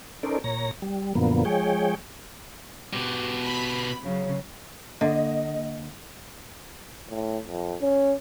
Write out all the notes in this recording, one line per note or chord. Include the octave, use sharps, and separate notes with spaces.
C#4 D#4 A4 A#4 C5 D5
A#2 C#5 A#5 A#6
G3
F#2 A#2 D3 F3 A#3 B3
F3 G#3 G#4 C#5 G5
B2 G4
B5
C#3 F#3
D3 A#3 D#5
A2
F2
C#4